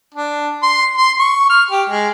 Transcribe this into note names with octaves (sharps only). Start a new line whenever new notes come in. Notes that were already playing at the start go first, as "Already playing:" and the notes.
D4
C6
C6
C#6
F6
G4
G#3